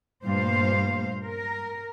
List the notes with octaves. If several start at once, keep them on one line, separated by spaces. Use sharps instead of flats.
G2 A#2 A3 C5 F5
A#4